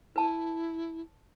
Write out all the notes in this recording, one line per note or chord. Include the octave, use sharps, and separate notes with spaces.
E4 B4 A5